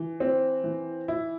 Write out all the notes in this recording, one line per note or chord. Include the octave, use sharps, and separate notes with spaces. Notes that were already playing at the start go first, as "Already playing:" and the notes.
Already playing: E3
C4
E3
E4